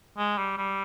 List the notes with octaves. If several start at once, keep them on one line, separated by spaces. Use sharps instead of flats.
G#3
G3
G3